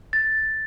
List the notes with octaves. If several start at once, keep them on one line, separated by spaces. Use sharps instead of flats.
A6